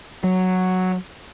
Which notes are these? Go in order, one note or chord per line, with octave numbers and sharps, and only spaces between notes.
F#3